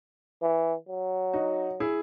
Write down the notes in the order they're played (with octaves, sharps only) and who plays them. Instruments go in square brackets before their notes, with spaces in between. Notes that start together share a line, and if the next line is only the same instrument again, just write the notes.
[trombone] E3
F#3
[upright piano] D#4 F#4
E4 G#4